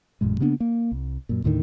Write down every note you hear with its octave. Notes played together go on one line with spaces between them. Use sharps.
A1 F#2 A#2 G#3
C#3 A#3 B3 D4
A#3
C2
F#2 A#2
D#2 A2 D3 D#3